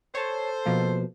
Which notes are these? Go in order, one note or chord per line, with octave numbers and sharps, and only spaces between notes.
A4 C5 C#5 A5
B2 F3 A#3